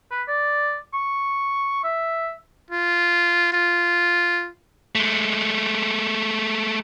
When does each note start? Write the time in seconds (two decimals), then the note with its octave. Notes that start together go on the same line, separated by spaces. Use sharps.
0.11 B4
0.28 D5
0.93 C#6
1.83 E5
2.71 F4
3.53 F4
4.95 G#3 A3